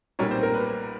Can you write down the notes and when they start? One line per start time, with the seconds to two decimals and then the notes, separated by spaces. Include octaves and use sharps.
0.19 B1 A#2 G3 A#3 C#4 C#5
0.31 C4 C5
0.43 A#4
0.54 B4